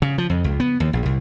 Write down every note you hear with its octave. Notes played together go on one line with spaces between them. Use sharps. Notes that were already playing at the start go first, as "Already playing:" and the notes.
C#3
F3
F2
C#2
B3
D#2
A#1
C2